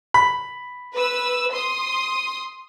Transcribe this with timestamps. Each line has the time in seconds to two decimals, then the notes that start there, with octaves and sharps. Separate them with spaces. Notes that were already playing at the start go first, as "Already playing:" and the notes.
0.14 B5
0.94 B4 E6
1.52 C6 D#6